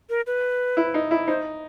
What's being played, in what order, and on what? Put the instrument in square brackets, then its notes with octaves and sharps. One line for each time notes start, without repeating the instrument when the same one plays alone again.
[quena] A#4
B4
[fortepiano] E4
D#4
E4
[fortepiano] D#4 [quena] C5